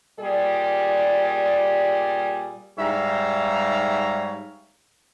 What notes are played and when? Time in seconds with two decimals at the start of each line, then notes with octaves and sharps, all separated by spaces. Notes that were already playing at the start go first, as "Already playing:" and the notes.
0.19 A#2 G3 G#4 D5
2.78 G#2 G3 C#5 E5 F5 A#5